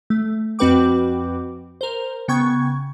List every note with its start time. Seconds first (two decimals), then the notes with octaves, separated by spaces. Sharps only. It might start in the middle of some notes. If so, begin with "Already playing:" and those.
0.10 A3
0.59 F2 C4 F#4 B4 G5 D6
1.81 A#4 C5
2.28 C#3 B3 G5 C#6 G#6